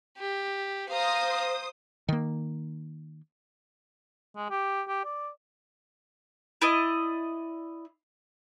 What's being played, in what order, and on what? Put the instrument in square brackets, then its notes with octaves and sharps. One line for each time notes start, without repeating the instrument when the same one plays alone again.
[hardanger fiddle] G4
[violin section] C5 D#6 [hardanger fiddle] F5 A#5
[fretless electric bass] D#3 A#3
[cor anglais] G#3
G4
G4
D5
[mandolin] E4 D5 D#5